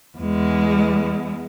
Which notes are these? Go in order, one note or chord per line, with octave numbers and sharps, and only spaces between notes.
E2 G#3